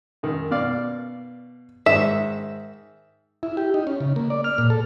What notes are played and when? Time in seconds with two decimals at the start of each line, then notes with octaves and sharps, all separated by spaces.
0.23 F#2 D#3
0.51 B2 D5 F5
1.86 G#2 D#3 E5
3.43 E4
3.57 G4
3.74 D#4
3.87 C#4
4.00 C#3
4.16 A#3
4.30 D5
4.44 F6
4.58 A#2
4.70 A4